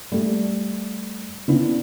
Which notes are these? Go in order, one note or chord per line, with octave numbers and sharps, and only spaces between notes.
G3 A3
D3 B3 C#4 D4 E4